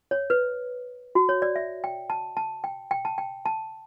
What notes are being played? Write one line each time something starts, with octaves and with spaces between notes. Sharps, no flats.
C#5
B4
F#4
C#5
D5
E5
G5
A5
A5
G5
G5
A5
G5
A5